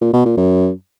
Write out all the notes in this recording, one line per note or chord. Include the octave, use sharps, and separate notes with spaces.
A#2
B2
A#2
F#2